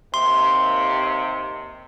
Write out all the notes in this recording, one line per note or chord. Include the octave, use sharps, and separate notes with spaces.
D#2 C3 C6